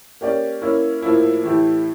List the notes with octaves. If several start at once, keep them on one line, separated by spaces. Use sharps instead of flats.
A#3 C#4 G4 D5
A#3 C#4 E4
A2 F3 A#3 E4
A2 E3 A3 E4 G4